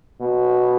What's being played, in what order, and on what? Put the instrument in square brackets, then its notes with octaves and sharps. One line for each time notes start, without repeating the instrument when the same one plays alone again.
[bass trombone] B2